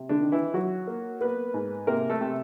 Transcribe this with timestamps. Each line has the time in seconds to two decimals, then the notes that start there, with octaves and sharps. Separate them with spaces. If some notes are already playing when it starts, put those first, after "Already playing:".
Already playing: C3
0.09 D3 D4
0.21 D#3
0.32 E3 E4
0.54 F#3 F#4
0.87 A#3
1.21 A#3 B3 B4
1.54 G#2
1.87 C3 A#3 A#4
2.10 A3 A4
2.21 C3